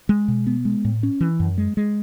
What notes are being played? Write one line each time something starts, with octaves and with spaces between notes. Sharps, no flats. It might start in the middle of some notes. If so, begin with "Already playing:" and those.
G#3
B2
B3
G#3
A2
C#4
E3
F#2
G#3
G#3